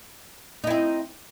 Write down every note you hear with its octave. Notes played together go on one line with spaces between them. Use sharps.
C4 D#4 E4